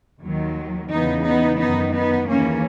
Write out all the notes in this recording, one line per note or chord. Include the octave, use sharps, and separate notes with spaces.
D#2 D#3 F#3
E2 C#3 E3 B3 D#4
B3 D#4
F#2 D#3 B3 D#4
B3 D#4
D#2 C#3 E3 A#3 C#4